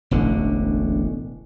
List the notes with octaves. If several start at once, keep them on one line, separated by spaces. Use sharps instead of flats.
E1 A1 D3